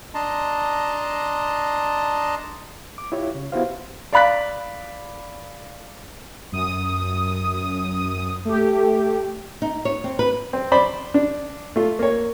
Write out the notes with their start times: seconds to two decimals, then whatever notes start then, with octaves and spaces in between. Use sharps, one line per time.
0.15 D4 D#5 A5 A#5 C6
2.98 D6
3.12 E4 F4 G4 C#5
3.35 C#3
3.52 B3 E4 F#4 G4 C5 F5
4.13 D5 F5 B5 F#6 B6
6.52 F#2 D#6
8.45 A3 G4
9.62 D#4
9.85 C#5
10.04 C4
10.19 B4
10.53 C4
10.72 C5 D5 B5
11.14 D4
11.76 A3 F4
11.99 A#3 C#5